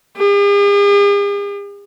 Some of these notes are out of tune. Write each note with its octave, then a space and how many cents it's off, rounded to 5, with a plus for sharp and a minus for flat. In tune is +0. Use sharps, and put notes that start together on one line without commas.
G#4 -45